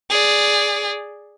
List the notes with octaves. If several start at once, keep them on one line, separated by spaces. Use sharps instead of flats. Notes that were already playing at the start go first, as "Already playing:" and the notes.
G#4 D5